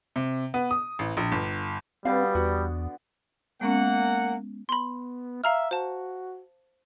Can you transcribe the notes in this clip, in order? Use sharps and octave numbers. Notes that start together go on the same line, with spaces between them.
C3
B3
D#6
A1
A#1
G1
B2 D3 G3 B3 C4 F5
E2 F#4
G#3 A#3 B3 C#4 F#5
B3 B5 C6
E5 F5 A#5 F6
F#4 C5 A5